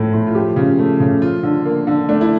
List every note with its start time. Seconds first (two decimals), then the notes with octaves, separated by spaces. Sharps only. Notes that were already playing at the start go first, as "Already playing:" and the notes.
Already playing: A2 F3 A3
0.13 A2
0.27 F4
0.35 F3 G4
0.56 C#3
0.79 A3
1.00 C#3
1.21 F3 F4
1.43 D3
1.65 A#3
1.87 D3
2.08 A3 D4
2.21 E4